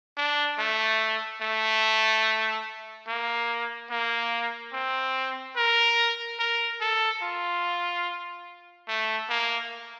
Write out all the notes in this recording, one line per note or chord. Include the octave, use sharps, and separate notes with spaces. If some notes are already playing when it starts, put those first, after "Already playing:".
D4
A3
A3
A#3
A#3
C4
A#4
A#4
A4
F4
A3
A#3